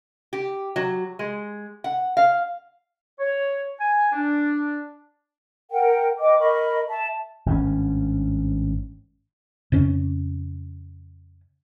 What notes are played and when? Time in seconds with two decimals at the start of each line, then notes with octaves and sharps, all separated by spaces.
0.33 G4
0.76 F#3
1.19 G#3
1.84 F#5
2.17 F5
3.19 C#5
3.80 G#5
4.13 D4
5.70 A#4 F#5 G5
6.19 B4 D#5 G5 D6
6.39 A#4 D#5 B5 C#6
6.89 E5 A5
7.46 G#1 G2 D#3 C#4
9.72 F2 C#3 C#4